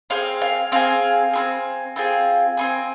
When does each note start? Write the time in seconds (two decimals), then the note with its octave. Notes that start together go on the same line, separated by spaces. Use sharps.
0.10 C4 G#4 F5
0.42 F5
0.72 C4 G#4 F5
1.33 C4 F4 G#4
1.96 C4 F4 G#4
2.57 C4 F4 G#4